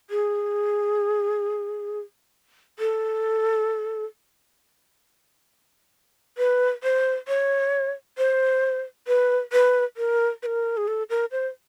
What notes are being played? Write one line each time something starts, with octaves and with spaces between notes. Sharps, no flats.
G#4
A4
B4
C5
C#5
C5
B4
B4
A#4
B4
A#4
G#4
A4
A#4
C5